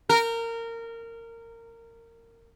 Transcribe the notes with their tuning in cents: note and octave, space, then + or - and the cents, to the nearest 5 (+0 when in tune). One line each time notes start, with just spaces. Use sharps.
A#4 -20